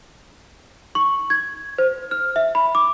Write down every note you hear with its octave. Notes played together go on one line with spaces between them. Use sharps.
C#6
G#6
C5
F6
E5
B5
D6